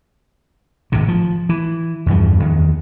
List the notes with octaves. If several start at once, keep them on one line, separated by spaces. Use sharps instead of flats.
G#1 A2 C3
F3
E3
E2 G2 E3 F3
E2 D#3